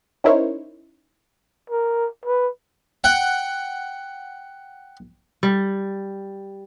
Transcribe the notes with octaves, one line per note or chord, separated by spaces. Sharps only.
C#4 D#4 E4 A#4 C5 C#5
A#4
B4
F#5 G5
G3